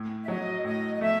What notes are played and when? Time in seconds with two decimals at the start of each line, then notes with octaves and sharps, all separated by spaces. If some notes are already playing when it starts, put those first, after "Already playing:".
Already playing: A2
0.24 E5
0.28 F#3 D#5
0.65 A2 D#5
0.95 D#5
1.01 A3 E5